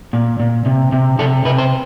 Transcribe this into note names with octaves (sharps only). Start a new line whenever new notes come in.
A#2
A#2
C3
C3
C3 A4
C3 B4
C5